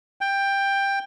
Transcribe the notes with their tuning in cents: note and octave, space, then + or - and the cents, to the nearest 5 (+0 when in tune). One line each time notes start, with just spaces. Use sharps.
G5 +15